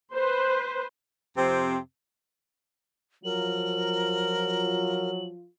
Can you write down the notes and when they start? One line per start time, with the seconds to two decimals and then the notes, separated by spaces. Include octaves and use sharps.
0.13 B4 C5
1.36 F2 C3 C4
3.24 F3 F#3 F4 A#4 F#7